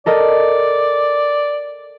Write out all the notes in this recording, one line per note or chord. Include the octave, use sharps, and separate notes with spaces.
A4 A#4 D5 D#5